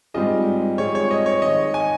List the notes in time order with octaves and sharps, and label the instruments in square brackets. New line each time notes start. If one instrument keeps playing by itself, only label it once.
[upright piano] G#2 G3 C4 F4 G#4 [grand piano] D#5
[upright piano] G#2 G3 C4 F4 G#4 [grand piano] C#5
[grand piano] C#5
D#5
C#5
[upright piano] G#2 D#3 G#3 [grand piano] D#5
[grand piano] G#5